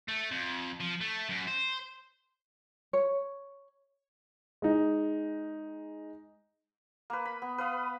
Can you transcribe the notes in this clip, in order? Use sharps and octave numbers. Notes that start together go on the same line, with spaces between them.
A3
F2
F3
A3
F#2
C5
C#5
G#3 D#4
A#3 B4
B5
B3
B4 F5 D#6